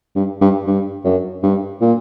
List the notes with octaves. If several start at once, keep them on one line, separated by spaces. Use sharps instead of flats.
G2
G2
G2
F#2
G2
A#2